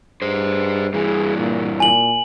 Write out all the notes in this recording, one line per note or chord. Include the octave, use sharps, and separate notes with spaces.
G2 G#4 C5
G2 E3 G#4
A#2
A#2 G#5 F#7